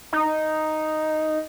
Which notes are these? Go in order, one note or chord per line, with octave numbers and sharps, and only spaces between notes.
D#4